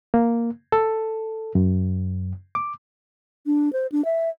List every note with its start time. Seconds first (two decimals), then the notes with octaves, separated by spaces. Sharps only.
0.14 A#3
0.72 A4
1.55 F#2
2.55 D6
3.46 D4
3.73 C5
3.92 D4
4.05 E5